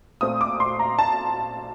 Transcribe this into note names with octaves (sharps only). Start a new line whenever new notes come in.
A#2 A3 C4 D#6
D6
C6
A#5
A5